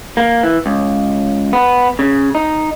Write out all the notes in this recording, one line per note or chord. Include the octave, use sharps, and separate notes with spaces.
A#3
E3
C#2
B3
C#3
D#4